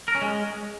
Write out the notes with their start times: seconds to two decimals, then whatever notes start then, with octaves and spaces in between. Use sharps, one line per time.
0.08 A#4
0.15 C#4
0.22 G#3